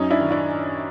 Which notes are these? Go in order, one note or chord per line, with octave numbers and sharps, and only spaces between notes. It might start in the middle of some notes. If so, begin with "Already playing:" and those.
Already playing: F#2 C#4 D#4
D4 E4
D#3
D4 E4